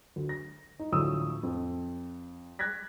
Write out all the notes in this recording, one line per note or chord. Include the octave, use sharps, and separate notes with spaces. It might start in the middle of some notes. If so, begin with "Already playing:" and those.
D2
A#6
D#4
D2 A2 F3 D#6 E6
F2
F#6 G#6 A#6 B6